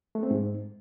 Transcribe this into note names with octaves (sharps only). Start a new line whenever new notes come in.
A3
C4
G#2